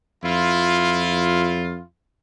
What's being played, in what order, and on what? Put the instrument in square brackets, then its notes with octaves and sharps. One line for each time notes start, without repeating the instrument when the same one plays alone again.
[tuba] F2 [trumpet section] E4 F4